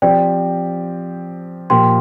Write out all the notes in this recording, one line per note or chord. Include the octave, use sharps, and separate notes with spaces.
F3 C4 G4 D5 G5
A#2 F3 A#3 G4 G5 C6